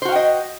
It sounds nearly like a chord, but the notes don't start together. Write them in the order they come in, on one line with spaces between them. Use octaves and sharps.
C5 F#4 F5 G5 D#5